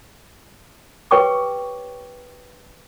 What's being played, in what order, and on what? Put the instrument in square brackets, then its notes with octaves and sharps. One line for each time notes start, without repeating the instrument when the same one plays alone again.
[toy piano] G4 B4 C#5 G5 C#6 D6